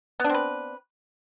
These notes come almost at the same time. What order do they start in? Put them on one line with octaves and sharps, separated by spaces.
B3 D4 C4 B4